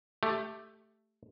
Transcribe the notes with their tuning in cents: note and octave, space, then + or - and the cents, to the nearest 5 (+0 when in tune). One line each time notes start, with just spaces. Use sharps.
A3 +0 G4 +5